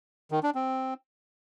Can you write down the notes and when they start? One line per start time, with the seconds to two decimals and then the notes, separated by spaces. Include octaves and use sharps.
0.31 D#3
0.43 D4
0.55 C4